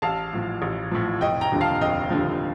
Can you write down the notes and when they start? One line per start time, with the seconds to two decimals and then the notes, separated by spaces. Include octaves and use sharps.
0.02 A1 F5 A5
0.33 A2 F3
0.62 A1
0.92 A2 F3
1.21 F1 D#5 G5
1.41 G5 A#5
1.52 D#2 D3 F3
1.61 F5 A5
1.81 F1 D#5 G5
2.10 D#2 D3 F3